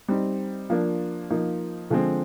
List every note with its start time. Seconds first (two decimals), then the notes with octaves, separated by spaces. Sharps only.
0.09 G3 C4 D#4
0.70 F3 A#3 D4
1.30 F3 A#3 D#4
1.90 D3 F3 G#3 C4